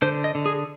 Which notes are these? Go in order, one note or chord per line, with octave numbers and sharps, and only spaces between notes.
D3 C5
D#5
D3
G#4